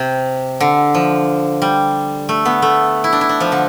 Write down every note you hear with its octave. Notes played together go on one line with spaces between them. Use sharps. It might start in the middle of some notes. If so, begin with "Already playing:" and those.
Already playing: C3
D3
F3
G3
A3
B3
A3
E4
D4
E4
D4
F3
D3